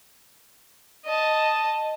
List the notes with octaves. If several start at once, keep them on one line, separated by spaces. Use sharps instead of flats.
D#5 A5